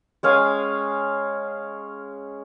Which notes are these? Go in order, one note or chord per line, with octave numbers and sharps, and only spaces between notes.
G#3 C#4 F5 G#5